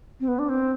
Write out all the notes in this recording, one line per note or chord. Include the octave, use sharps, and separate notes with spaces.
C4
B3
D4
C4